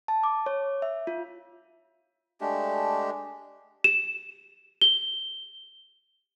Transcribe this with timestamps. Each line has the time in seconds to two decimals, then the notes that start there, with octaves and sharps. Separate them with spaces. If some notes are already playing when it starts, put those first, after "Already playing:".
0.08 A5
0.23 D6
0.46 C#5
0.82 E5
1.07 F4
2.41 G#3 A3 D4 G4
3.84 E7
4.81 G7